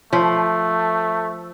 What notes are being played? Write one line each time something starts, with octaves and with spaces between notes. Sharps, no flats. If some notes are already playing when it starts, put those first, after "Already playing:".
F3 A3